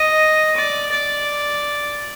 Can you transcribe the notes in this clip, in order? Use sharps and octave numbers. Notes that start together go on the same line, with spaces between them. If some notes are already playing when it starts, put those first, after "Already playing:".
Already playing: D#5
D5
D5